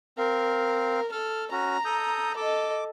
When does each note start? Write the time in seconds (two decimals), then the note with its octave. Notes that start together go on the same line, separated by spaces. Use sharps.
0.18 C4 A#4 F5
1.12 A4 F6
1.52 C#4 F#4 A#5
1.85 A4 D#6 G6
2.37 A4 D#5 D6